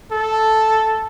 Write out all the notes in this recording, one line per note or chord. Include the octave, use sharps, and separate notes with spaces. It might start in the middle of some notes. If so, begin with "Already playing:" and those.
A4